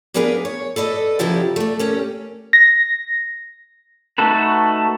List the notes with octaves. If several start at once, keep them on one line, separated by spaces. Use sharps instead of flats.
A#3 B3 D4 G#4 A#4 B4
C#5
A4 B4 D5 D#5
C#3 F3 F#3 E4 G4
A3 D5
A#3 C#4 G4
A#6
A3 D#4 F#4 A4 B4